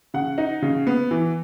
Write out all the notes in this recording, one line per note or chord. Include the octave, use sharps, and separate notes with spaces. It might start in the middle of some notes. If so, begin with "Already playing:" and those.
C#3 F#5
D#4
C#3
B3
E3